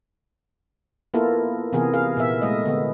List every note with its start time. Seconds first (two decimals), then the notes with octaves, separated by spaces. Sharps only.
1.14 A#3 B3 E4 F4 A4 A#4
1.73 C3 E3 B3 G#4 A#4
1.94 G#4 A#4 F5
2.17 A#2 A#3 B3 E5
2.42 G#3 A3 D#5
2.66 D3 B3